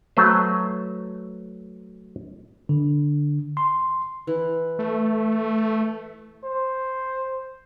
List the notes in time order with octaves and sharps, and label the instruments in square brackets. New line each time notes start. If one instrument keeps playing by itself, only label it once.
[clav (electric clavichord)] F#3 A3 B4 C5
[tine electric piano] D3
C6
[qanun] E3
[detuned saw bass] A3
[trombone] C5